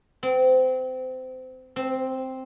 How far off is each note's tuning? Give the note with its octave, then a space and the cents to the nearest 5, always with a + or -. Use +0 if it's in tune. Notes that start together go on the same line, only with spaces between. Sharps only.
C4 -25
C4 +0